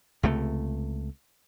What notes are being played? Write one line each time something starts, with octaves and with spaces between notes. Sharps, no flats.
C#2 C3 A3